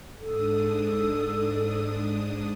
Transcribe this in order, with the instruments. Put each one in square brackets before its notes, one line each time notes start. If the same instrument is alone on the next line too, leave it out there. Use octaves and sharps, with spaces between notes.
[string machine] G#2 D4 D#6 [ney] A4